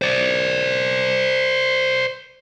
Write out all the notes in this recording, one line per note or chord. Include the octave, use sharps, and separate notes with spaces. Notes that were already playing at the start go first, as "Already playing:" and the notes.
C5 D5